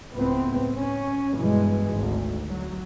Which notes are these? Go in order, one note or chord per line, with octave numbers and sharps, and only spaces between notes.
C#2 A2 B3 C4
C#4
G2 B2 E3 G#3
G#1 D2
F#3